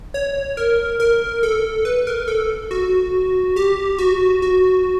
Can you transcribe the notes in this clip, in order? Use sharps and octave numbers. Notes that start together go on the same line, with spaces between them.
C#5
A#4
A#4
A4
B4
A#4
A4
F#4
G4
F#4
F#4